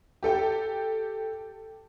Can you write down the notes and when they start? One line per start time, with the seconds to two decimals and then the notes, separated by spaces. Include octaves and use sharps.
0.23 G4 A4 G5